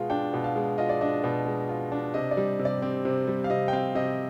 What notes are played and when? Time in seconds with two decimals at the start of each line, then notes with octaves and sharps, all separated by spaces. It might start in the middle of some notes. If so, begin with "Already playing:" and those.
Already playing: B2 G#3 F4
0.10 D4 G5
0.33 B2
0.44 F5
0.56 G#3
0.78 F4 D#5
0.89 D5
1.01 D4 D#5
1.24 B2
1.47 G#3
1.69 F4
1.92 D4
2.14 C3 D#5
2.31 D5
2.37 G3
2.59 C3
2.65 D5
2.82 C4
3.05 C3
3.27 G3
3.44 F5
3.50 C3 D#5
3.68 G5
3.73 C4 F5
3.95 C3 D#5